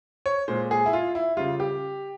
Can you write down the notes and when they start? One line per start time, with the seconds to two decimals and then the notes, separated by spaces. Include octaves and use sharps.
0.26 C#5
0.48 A#2 G#3 C5
0.71 G#4
0.86 E4
0.93 F4
1.15 E4
1.37 C#3 G3 F4
1.60 G4